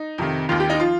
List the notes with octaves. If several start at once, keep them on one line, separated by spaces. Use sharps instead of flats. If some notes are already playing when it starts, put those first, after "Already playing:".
Already playing: D#4
F2 C3 D#3
D#2 D#3 F4
G4
D#4
F3 F4